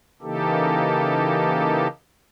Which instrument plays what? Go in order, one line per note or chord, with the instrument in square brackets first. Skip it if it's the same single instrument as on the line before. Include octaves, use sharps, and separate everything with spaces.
[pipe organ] C#3 E3 A#3 D#4 G4 A4